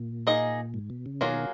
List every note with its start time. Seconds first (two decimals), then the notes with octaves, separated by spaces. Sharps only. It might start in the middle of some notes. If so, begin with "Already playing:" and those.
Already playing: A#2
0.27 A#3 D#4 G#4 D#5
0.74 G#2
0.90 B2
1.06 C#3
1.21 B2 D#3 F#3 A#3 F4 G#4